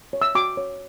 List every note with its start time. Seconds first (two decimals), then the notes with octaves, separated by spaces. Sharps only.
0.13 C#5
0.22 E6
0.35 F#4 D6
0.57 C#5